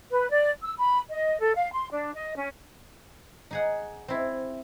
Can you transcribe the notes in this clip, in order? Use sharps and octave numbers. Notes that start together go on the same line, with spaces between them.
B4
D5
E6
B5
D#5
A4
F5
C6
D4
D#5
C#4
D#4 G#4 F#5
C4 E4